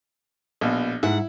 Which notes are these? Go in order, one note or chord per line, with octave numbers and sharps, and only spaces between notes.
A#1 B2
G#2 E4 F#5